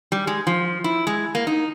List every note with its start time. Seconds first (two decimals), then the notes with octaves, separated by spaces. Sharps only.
0.12 G3
0.27 G#3
0.47 F3
0.84 E4
1.07 G#3
1.35 A#3
1.47 D#4